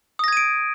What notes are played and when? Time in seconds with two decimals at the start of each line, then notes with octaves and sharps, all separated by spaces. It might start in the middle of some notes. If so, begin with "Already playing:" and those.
0.19 D#6
0.24 A#6
0.28 G#6
0.33 D#7
0.37 D7